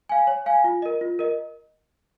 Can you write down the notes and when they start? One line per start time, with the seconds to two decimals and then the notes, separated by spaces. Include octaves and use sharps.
0.09 F5 G#5
0.27 C#5
0.46 F5 G#5
0.64 F4
0.82 A#4 D#5
1.01 F4
1.19 A#4 D#5